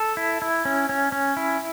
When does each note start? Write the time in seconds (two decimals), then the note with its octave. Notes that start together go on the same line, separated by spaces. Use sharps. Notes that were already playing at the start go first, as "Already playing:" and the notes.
Already playing: A4
0.17 E4
0.42 E4
0.65 C#4
0.89 C#4
1.12 C#4
1.37 E4